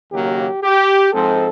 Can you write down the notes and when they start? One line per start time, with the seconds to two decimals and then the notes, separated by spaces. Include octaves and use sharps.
0.11 D#2 C#3 F#3 A#3 G4
0.62 G4
1.12 G#2 F3 G#3 C4 A4